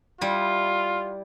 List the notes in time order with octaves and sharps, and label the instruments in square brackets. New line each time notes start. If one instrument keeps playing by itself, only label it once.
[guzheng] G3 E4 [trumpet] F4